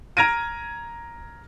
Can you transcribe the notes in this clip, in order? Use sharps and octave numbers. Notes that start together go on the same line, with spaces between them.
A#5 F6 G#6 A#6 D7 D#7